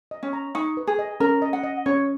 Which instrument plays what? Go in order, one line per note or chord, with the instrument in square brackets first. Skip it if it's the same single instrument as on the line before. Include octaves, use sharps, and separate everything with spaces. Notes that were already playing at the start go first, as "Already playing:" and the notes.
[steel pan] D#5
[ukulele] C#4
[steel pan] A#5
[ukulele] D#4 [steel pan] C#6
[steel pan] B4
[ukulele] G#4
[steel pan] D#5
[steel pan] C#4 [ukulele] A#4
[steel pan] D#5
[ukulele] F#5
[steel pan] D#5
[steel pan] C#4 [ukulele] C#5